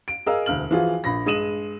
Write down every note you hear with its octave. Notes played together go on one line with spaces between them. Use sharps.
D7
G#4 A#4 D#5 F5 E6
E1 D2 F6 F#7
E3 F3 F4 F#4 G#4
A#1 B5 A#6
G2 G#3 D#6 D#7 E7 F#7